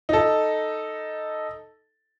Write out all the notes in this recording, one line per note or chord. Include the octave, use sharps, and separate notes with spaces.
D#4 A4